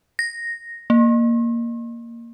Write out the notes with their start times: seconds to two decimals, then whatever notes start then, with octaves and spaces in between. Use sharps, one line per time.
0.19 A#6
0.90 A#3